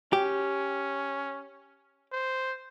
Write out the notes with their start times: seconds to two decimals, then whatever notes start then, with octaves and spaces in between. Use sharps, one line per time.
0.13 C#4 G4
2.12 C5